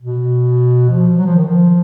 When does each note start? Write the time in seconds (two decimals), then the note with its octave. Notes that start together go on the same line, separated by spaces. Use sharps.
0.02 B2
0.89 F3
1.17 F#3
1.26 F3
1.36 D#3
1.46 F3